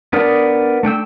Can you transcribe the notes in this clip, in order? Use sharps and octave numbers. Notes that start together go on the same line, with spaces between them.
B3 D4 A#4 D5 D#6
A3 D4 G5 E6